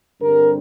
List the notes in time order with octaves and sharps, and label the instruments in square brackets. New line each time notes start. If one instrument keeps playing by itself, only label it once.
[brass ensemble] G2 D3 G3 C4 A#4